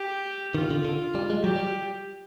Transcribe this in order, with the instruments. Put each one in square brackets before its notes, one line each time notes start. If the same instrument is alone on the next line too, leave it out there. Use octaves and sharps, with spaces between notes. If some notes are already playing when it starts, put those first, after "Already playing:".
Already playing: [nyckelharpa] G4
[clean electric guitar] D#3 [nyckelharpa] F4
[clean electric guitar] D3
D3
G3
G#3
[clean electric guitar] F#3 [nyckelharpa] G4
[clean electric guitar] G3